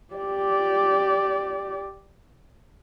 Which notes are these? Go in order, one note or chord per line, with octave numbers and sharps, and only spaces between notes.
G4 D5